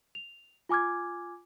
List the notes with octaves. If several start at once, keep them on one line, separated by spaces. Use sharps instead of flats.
F7
F4 G#5 D6 F6 G#6